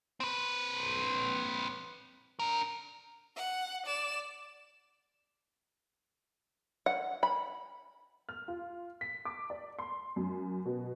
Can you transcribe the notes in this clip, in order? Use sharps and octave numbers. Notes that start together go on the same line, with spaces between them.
C4 B4
D4 A#4
F#5
D5 E7
F#5
B5
F6
F4
B6
D6
D5
C6
F#2
B2